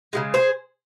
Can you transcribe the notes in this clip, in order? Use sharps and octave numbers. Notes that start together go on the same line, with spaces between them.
C#3 F3 G#3
G#4 C5